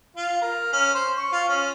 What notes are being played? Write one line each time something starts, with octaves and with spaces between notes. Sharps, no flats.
F4
A#4
C#4
C5
C#6
F4
C#4